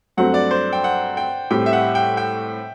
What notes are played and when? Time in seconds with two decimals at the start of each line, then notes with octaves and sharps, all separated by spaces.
0.17 G2 F#3 A3 C4 F#4 F#5
0.34 D5
0.51 C5
0.73 G5
0.84 F#5
1.17 G5
1.50 A2 G3 C4 G4 G5
1.66 E5
1.73 F#5
1.95 G5
2.17 G5